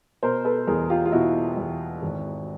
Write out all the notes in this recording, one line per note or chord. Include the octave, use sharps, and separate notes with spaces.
B2 A#4 C5
A4 B4
E2 G#4 A#4
F4 G4
F4
B2 E4 F#4
E2
G#1